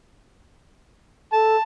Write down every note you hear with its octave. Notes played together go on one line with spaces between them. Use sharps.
A4 A5